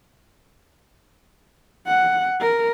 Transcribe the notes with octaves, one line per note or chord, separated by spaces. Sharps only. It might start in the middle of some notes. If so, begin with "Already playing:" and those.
F#5
A#4